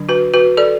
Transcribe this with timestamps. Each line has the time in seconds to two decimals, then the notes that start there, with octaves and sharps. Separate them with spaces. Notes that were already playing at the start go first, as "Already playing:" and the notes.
Already playing: D3 F#3 D4
0.09 F#4 B4
0.34 F#4 B4
0.57 A4 D5